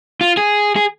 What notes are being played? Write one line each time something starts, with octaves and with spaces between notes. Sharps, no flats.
F4
G#4
G#4